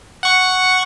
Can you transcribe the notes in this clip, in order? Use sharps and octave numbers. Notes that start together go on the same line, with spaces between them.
F#5 C#6